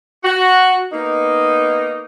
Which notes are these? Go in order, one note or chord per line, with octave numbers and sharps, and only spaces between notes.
F#4
A#3 B3 D#4